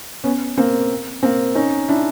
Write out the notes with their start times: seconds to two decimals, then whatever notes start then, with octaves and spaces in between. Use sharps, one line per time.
0.24 B3 C#4
0.58 A#3 C4
1.23 A#3 C4
1.55 C#4 D#4
1.88 D4 E4